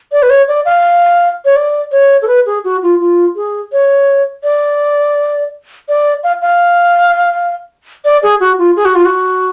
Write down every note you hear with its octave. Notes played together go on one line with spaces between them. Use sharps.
D5
B4
C#5
D5
F5
C#5
D5
C#5
A4
B4
G#4
F#4
F4
F4
G#4
C#5
D5
D5
F5
F5
D5
G#4
F#4
F4
G#4
F#4
F4
F#4